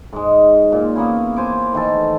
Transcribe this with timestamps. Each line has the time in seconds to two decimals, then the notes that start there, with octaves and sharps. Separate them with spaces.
0.13 G#2 G#3
0.72 A#2
0.95 A#3 B3 C#4 E4
1.36 C5 G#5 C#6 D6
1.73 D#3 E3 A3 A4